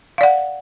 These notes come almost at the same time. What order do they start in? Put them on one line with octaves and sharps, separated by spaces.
F5 D5 F#5